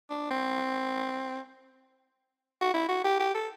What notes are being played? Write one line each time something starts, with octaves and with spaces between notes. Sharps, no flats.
D4
C4
F#4
E4
F#4
G4
G4
A4